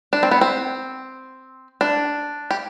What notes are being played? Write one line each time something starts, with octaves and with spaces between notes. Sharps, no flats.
D4
C4
B3
C4
D4
G4